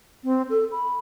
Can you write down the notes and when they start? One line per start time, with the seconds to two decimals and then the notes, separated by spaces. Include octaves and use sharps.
0.24 C4
0.50 A4
0.72 B5